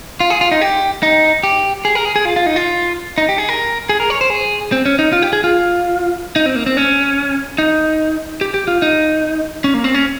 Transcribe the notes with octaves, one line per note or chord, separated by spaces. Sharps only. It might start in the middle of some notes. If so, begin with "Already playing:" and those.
F4
G#4
F4
D#4
G4
D#4
G4
G#4
A#4
G#4
G#4
F4
F4
D#4
F4
D#4
G4
G#4
A#4
G#4
A#4
C#5
C5
G#4
C4
C#4
D#4
F4
G4
G#4
F4
D#4
C4
A#3
C4
C#4
D#4
G4
G4
F4
D#4
C#4
A#3
C4
C#4